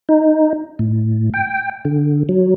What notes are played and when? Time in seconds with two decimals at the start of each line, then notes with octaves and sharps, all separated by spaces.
0.09 D#4
0.79 A2
1.34 G5
1.85 D3
2.29 F#3